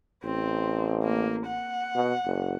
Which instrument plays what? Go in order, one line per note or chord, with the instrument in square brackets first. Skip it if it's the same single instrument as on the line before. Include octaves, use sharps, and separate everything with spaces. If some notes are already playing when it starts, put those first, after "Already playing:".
[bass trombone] A1 [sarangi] C4
[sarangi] A#3
F#5
[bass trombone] B2
F#1